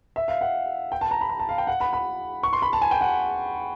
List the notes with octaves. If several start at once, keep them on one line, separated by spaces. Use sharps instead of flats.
E5
F5
F#5
G5
A5
A#5
B5
A#5
A5
F5
G5
F#5
B5
B5
C#6
C6
B5
A5
G#5
G5
F#5